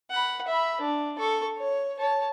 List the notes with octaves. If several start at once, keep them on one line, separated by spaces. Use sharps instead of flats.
F#5 B5
E5 B5
D4
A4 C#6
C#5
C#5 A5